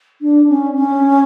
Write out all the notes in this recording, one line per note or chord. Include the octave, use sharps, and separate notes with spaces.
D4
C#4
C#4